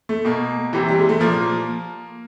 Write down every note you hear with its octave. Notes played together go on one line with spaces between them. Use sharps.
A3
B2 A#3
C3 E3
G3
G#3
A3
A#2 F3 A#3